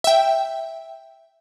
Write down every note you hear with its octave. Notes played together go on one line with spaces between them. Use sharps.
E5 G5